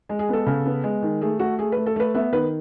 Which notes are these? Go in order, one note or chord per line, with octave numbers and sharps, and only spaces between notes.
G#3
G#4
B3 A4
C#3
B3
G#3
D#3
A3 G#4
A3 F#4
A3 G#4
A3 B4
A4
A3 B4
B3 E5
D#3 B4